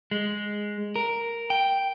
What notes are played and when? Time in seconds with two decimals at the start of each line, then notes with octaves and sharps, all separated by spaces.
0.11 G#3
0.96 A#4
1.50 G5